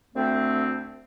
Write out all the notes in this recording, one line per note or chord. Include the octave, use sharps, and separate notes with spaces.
D2 D3 A3 C4